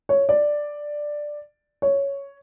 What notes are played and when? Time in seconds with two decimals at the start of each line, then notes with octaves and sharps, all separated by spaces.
0.09 C#5
0.29 D5
1.82 C#5